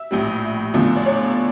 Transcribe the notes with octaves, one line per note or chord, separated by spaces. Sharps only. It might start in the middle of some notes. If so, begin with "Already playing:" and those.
Already playing: E5
A#1 A2 G3
E2 D3 F3 A3
D5
C#5